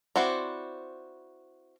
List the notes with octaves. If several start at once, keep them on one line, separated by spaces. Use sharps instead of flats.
C4 E4 F#4 C5 D5